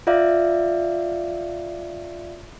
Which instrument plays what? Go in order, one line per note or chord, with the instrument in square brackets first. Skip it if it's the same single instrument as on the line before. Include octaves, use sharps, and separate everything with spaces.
[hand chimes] F4 D5 E5 F5